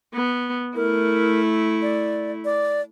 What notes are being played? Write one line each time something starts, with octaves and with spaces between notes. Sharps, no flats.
B3
A3 E4 A#4
D5
D5